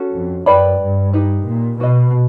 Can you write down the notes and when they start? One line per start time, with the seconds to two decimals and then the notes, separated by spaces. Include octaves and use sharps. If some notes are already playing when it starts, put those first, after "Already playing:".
Already playing: C#4 F#4 A4
0.13 F2
0.46 F#2 B4 D5 G5 B5
0.81 G2
1.13 D#4 G4 B4
1.47 A#2
1.80 B2 F#4 B4 D#5